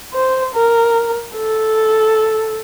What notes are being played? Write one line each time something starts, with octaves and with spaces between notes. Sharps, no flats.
C5
A#4
A4